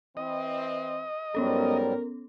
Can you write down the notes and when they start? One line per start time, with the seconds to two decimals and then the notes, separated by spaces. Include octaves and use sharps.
0.17 E3 C4 D#5
1.35 G#2 F#3 G3 B3 C#4 A4 A#4